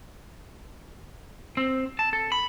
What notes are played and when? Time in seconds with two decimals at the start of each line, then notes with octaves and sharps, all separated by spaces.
1.57 C4
1.99 A5
2.13 A4
2.32 B5